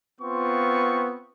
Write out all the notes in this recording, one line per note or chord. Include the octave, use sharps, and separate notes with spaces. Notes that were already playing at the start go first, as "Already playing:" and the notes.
B3 C4 F4 C#6